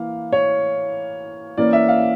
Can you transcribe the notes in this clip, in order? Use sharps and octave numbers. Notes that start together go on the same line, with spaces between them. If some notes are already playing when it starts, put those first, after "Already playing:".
Already playing: E3 A#3 F5
C#5
E3 A#3 C#4 D5
E5
F5